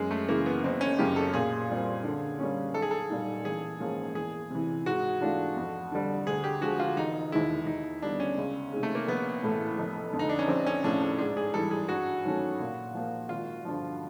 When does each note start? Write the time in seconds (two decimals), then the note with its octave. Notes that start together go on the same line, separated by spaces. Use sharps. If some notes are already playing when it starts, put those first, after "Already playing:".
Already playing: F#2 G#3
0.11 A3
0.28 C#3 E3 G#3 A#3
0.46 B3
0.64 F#1 C4
0.81 C#4
0.99 F#2 C#3 G4
1.16 A4
1.33 A#2 G#4
1.70 G3 C4 F4
2.04 D3
2.39 G3 A#3 C#4
2.74 B1 A4
2.82 G#4
2.91 A4
3.09 A#2 G3 A#3 D#4
3.45 A1 G#4
3.80 G#2 F3 A#3 C#4
4.15 E2 G#4
4.50 C3 E3
4.86 G#2 F#4
5.20 E3 A3 D4 F4
5.56 F2
5.92 D3 G3
6.27 D2 G#4
6.44 G4
6.61 D3 F3 G#3 F#4
6.80 F4
6.97 E1 D#4
7.32 D#2 D#3 G#3 E4
7.66 D#2 D#4
8.02 D3 G3 B3 D4
8.20 C#4
8.38 C#2
8.72 C3 D#3 G#3
8.83 A3
8.95 A#3
9.08 A#1 B3
9.43 A2 E3 A3
9.78 F1
10.13 F2 D3
10.19 D#4
10.29 D4
10.39 C#4
10.48 A#1 C4
10.66 C#4
10.84 A2 F3 A3 C#4 D4
11.02 D4
11.18 G#2 D4
11.37 G#4
11.54 E3 G3 A4
11.71 G#4
11.88 G2 F#4
12.25 D#3 F#3 A3 C#4
12.60 A#2
12.94 F3 A#3
13.29 G#1 F4
13.65 G2 D3 F3